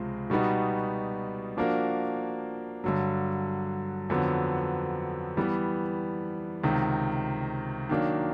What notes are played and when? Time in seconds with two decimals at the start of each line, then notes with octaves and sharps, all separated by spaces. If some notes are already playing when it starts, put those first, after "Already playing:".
Already playing: C#2 C3 F3 G#3
0.30 B2 G3 B3 D#4 F#4
1.57 F3 A#3 D4 F#4 A#4
2.84 G2 D3 F#3
4.10 F2 D3 F#3 B3
5.37 E3 G3 B3
6.63 C#2 C3 D#3
7.89 D#3 F#3 A#3 D4